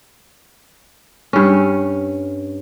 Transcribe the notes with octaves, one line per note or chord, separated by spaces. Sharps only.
G2 C#4